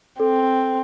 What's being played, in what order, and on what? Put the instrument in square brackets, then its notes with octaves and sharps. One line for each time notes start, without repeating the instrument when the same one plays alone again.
[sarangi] C4 [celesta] A4